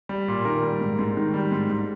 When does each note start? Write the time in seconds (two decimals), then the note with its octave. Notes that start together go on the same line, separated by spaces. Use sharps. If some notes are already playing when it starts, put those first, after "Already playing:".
0.09 G3
0.28 A#2
0.45 D#3 A#4
0.63 G3
0.81 G#2
0.99 G#2
1.17 D#3
1.34 G3
1.52 G#2
1.69 G#2